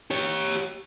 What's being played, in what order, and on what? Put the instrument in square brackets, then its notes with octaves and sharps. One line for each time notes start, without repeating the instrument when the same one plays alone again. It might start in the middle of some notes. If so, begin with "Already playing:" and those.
[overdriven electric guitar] G4 C#5